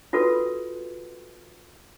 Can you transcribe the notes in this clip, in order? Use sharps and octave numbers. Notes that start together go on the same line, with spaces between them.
F4 F#4 A4 B4